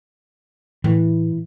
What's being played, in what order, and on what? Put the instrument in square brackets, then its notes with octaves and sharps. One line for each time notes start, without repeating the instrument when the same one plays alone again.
[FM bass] A2 [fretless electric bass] E3